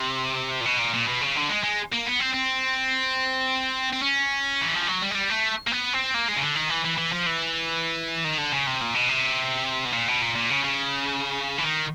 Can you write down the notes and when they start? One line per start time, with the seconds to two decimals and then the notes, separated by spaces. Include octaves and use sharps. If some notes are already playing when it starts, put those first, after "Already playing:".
Already playing: C3
0.61 A#2
0.65 B2
0.79 A#2
0.94 A#2
1.08 B2
1.21 C#3
1.36 D3
1.49 G#3
1.63 G#3
1.92 A#3
2.06 B3
2.20 C4
2.34 C4
3.93 C4
4.02 C#4
4.62 E3
4.75 F3
4.88 F#3
5.02 G3
5.11 G#3
5.15 G3
5.30 A3
5.67 A#3
5.72 B3
5.93 C4
6.14 A#3
6.28 G#3
6.37 C#3
6.42 D3
6.55 D#3
6.70 E3
6.85 E3
6.98 E3
7.12 F3
7.26 E3
8.24 D#3
8.38 D3
8.52 C#3
8.67 C3
8.81 A#2
8.95 B2
9.09 C3
9.85 B2
9.93 A#2
10.08 B2
10.22 A#2
10.35 A#2
10.50 C#3
10.64 C#3
11.58 E3
11.63 D#3